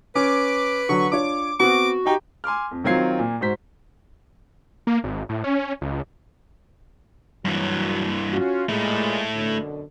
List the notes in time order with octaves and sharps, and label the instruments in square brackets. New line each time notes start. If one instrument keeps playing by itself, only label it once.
[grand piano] C#4 [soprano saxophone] B4 [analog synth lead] D6
[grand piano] D3 F#3 [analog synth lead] C#6
[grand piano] D4 F4 C#5 [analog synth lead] D6
[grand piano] B3 C4 [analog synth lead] F#4 [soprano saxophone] D6
[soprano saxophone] D#4 [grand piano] G4 G5 A#5
[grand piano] G#5 C6 D6 F6
F2
D#3 F#3 C4 F4 G#6 C7
A#2
G#2 F#4 C5 B6
[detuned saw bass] A#3
G#1
A2
C#4
C#2
[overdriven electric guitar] G2 E3 [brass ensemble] A#2 F#3
[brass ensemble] C#4 F4 F#4
[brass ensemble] A#2 G#3 [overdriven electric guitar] A3 E4
[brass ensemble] F#2 B2 D3